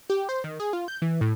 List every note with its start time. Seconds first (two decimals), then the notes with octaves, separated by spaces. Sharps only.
0.10 G4
0.29 C5
0.44 D#3
0.60 G#4
0.73 F4
0.88 G6
1.02 E3
1.21 A2